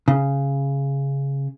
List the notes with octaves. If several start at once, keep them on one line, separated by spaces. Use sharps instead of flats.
C#3